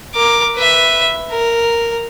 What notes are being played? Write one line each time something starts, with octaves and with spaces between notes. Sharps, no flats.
A#4 D6
B4 E5
A#4